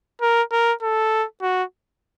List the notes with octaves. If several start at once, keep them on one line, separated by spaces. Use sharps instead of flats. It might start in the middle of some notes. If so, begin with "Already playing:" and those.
A#4
A#4
A4
F#4